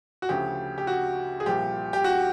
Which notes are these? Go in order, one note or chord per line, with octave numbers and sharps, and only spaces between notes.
F#4
D2 C#3 F3 G4
G4
F#4
G#4
C2 A#2 F3 G4
G4
F#4